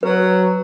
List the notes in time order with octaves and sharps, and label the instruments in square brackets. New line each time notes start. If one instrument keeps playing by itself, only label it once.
[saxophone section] F#3 [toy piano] B4